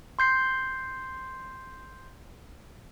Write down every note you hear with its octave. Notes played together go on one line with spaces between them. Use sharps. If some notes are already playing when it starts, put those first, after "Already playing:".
C6 G6 C7